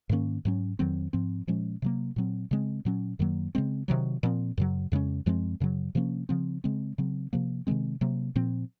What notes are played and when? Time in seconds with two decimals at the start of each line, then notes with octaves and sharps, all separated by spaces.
0.09 G#2 D#3 A#3 C#4
0.45 G#2 F#3 C#4
0.79 F2 D#3 F#3 C4
1.13 G#2 F3 C4
1.47 A#2 F3 G#3 C#4
1.82 C3 F#3 A#3
2.16 A#2 F#3 C4
2.51 C#3 G#3 C4
2.85 A#2 F#3 C#4
3.19 F#2 D#3 F#3 A#3
3.55 C#3 G#3 C4
3.88 C3 D#3 F#3
4.23 A#2 F3 C4
4.58 F#2 C#3 F#3
4.92 F2 C#3 G#3 C#4
5.26 F#2 F3 G#3 C4
5.60 F#2 C#3 F#3
5.95 C3 F3 A#3 C#4
6.29 C#3 F3 C4
6.64 C#3 G#3 C4
6.98 C#3 F#3 C4
7.33 C3 F3 A#3
7.67 C3 D#3 G#3 C4
8.01 C3 F#3 A#3
8.36 A#2 F3 C4